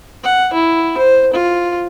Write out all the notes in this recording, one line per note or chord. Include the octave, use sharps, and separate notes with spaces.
F#5
E4
C5
F4